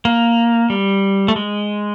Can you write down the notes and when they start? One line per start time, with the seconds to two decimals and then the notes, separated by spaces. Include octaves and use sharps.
0.05 A#3
0.70 G3
1.28 A3
1.36 G#3